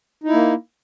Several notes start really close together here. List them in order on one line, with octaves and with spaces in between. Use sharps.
D#4 E4 A#3